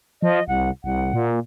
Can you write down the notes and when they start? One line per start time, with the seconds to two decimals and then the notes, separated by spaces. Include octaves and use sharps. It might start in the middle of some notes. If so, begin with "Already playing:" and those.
0.22 F3 D#5
0.48 C2 F#5
0.84 C2 F#5
1.13 A#2